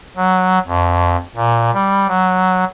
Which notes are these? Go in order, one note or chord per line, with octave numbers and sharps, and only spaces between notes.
F#3
F2
A#2
G3
F#3